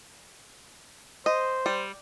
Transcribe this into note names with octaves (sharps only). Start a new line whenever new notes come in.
C5 D#5
G3